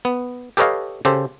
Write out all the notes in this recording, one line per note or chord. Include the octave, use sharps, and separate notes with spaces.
B3
G4 A4 B4 C#5 D#5 F5
C#3 G4 A4 C5